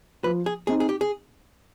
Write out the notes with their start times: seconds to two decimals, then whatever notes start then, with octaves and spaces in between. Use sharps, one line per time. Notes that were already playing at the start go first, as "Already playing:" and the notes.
0.24 F3 B4
0.46 G#4
0.67 C4 D#4 G#4
0.80 G#4
0.89 G4
1.01 G#4